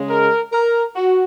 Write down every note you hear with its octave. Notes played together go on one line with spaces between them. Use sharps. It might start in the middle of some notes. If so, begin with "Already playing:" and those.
Already playing: C#3 G#3
A#4
A#4
F#4